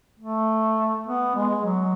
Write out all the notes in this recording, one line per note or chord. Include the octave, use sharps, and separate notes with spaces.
A3
B3
G#3
F#3